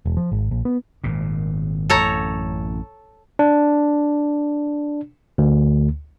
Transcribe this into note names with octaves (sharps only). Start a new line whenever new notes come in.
E1
F3
G#1
A#1
B3
G#1 A#2
A1 F#2 A4 C#5 A#5
D4
D2